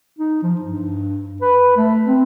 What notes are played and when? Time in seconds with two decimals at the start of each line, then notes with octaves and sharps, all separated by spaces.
0.19 D#4
0.43 F3
0.61 G2
1.42 B4
1.77 A3
2.06 C4